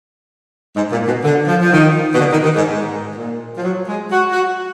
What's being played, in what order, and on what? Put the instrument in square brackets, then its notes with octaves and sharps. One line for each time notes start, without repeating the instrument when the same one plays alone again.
[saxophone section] G#2
A#2
B2
D3
F3
F3
D#3
B2
D3
D#3
D#3
G#2
G#2
A#2
F3
F#3
G#3
F#4
F#4